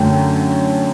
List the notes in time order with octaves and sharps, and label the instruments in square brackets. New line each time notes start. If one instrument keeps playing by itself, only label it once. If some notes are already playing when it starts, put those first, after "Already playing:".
Already playing: [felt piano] F#2 D3 F#3 A3 G5